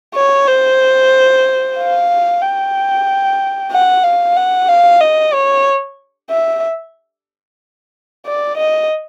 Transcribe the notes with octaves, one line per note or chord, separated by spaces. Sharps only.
C#5
C5
F5
G5
F#5
F5
F#5
F5
D#5
C#5
E5
D5
D#5